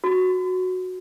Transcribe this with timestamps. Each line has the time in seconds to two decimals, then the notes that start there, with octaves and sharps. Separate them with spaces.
0.04 F#4